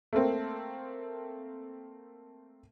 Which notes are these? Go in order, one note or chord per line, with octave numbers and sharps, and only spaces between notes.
A3 A#3 C4